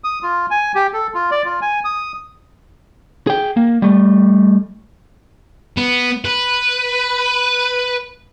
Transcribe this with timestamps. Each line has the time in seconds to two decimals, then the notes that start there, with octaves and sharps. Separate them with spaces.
0.04 D#6
0.23 F4
0.51 G#5
0.75 G4
0.93 A4
1.14 F4
1.31 D5
1.45 F4
1.62 G#5
1.85 D#6
3.27 G#4 G5
3.57 A#3
3.82 G3 A3
5.77 B3
6.25 B4